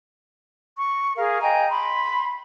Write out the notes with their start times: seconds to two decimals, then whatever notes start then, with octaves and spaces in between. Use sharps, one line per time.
0.77 C#6
1.17 G#4 A#4 F5
1.41 D#5 G5 G#5 A#5
1.68 B5 C6